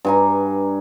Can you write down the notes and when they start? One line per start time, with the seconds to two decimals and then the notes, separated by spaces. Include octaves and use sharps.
0.05 G2 G#5 A#5